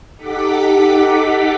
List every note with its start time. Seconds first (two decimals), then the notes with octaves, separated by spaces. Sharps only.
0.16 D#4 G4 A4 F#5 D6 B6